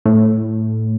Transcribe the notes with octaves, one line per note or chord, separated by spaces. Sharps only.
A2